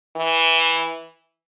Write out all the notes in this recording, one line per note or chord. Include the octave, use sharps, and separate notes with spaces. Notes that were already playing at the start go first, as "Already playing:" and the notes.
E3